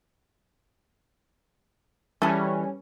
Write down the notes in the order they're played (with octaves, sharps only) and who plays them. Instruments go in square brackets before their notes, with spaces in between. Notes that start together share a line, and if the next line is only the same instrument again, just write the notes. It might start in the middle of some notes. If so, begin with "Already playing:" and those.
[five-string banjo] E3 [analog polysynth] G3 C#4 [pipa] G#4 A4